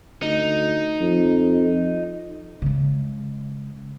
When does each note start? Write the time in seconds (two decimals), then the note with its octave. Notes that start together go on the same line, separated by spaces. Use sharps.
0.22 D2 D#4
1.00 F2
2.62 C#3 G#3